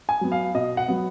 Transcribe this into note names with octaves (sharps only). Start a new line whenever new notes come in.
G#5
F#3 B3
F5
B2 D#5
F#5
F#3 B3